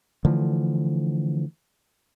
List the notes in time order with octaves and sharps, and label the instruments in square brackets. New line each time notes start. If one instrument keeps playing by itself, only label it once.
[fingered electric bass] D3 E3 F3 A3